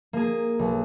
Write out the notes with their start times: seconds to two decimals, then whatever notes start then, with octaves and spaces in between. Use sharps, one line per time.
0.13 A#3 G#4
0.59 B1